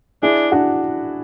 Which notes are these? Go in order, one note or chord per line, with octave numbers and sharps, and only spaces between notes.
D4 E4 G#4
D4 F#4